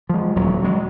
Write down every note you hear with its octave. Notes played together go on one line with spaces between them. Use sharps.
F3 G#3
D#1 D#2 F#3
F#3 G#3